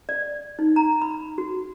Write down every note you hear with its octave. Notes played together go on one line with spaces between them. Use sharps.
D5
D#4
A#5
B5
F#4